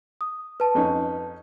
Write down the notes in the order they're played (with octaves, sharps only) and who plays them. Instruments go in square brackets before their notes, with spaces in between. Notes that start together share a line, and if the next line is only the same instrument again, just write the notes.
[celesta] D#6
B4 A5
[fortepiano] F2 C#4 D#4